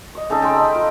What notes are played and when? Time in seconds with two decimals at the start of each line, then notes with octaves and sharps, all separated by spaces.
0.15 C#5 D#5
0.30 C#3 D#4 A4
0.42 G5 C6
0.56 D#5 B5
0.75 F4